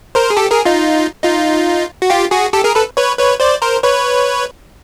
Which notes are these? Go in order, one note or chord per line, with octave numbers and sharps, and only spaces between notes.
A#4 C5
G#4
G4 A4
G#4 A#4
D#4 F4
D#4 F4
F#4
F4 G4
F#4 G#4
G4 A4
G#4 A#4
A4 B4
B4 C#5
B4 C#5
C5 D5
A#4 C5
B4 C#5